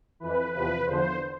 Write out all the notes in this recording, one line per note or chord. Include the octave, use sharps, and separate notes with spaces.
F2 E3 B4
E2 C3 F3 B4
E2 D3 F3 C5